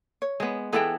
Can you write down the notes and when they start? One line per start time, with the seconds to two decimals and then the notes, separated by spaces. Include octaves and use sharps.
0.22 C#5
0.40 G#3 B3
0.72 E3 B3 D4 G#4 A4 G5